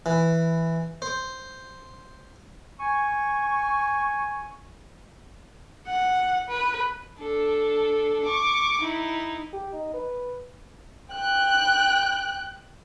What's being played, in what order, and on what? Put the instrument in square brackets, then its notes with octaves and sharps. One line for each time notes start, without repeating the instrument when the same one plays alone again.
[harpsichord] E3
C5
[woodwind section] G#5 C#6
[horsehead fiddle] F#5
B4
[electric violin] D4 A4
C#6 D6
D#4 E4
[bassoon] G4
D#4
B4
[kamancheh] G5 F#6